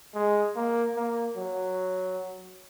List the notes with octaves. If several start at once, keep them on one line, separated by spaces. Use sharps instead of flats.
G#3
A#3
A#3
F#3